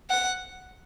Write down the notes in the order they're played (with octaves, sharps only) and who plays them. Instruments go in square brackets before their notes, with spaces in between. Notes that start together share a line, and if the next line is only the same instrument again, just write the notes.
[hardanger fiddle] F#5